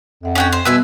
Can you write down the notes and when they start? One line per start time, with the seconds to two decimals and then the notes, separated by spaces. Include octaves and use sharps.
0.23 F2 E5 F#5
0.35 C#4 F#4 G5
0.52 C5
0.65 B2 G3 B3 B4 E5 G#5